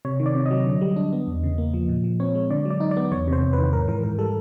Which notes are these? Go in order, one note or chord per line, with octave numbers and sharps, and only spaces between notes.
C3 C#5
D#3
D5
C3
D#5
F#3
D3
G3
D4
B3
E2
C#3
A#3
F3
A#2
F3
C4 C#5
G#3
D3 D5
F#3
D5
D#4
D5
B3
E2 C#5
C3
C5
E2
D#3 B4
G#2 A#4
E3 A#4
G#2 A#4
G3 A4